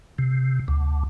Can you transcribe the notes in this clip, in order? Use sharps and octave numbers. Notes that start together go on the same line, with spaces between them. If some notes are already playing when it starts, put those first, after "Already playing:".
C3
D2